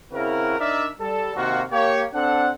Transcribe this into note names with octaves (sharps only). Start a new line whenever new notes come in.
C#3 C4 E4 F#4 A#4
D4 D#4 A#4 D5 E5
G3 A4
C3 D#3 A#3 F4 F#4
A#3 G4 C#5
C4 D4 A4 F#5